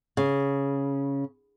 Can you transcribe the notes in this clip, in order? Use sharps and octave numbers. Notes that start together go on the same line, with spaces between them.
C#3